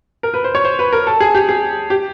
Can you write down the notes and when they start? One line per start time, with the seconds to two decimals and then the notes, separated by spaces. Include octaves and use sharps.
0.23 A#4
0.34 B4
0.44 C5
0.55 C#5
0.65 C5
0.79 B4
0.93 A#4
1.07 A4
1.20 G#4
1.35 G4
1.49 G#4
1.90 G4